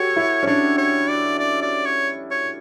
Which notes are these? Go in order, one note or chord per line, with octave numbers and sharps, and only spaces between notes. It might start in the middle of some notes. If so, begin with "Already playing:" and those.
Already playing: F#4 G4 A4 C#5
E4
C#4
D4 C#5
C#5
D5
D5
D5
C#5
C#5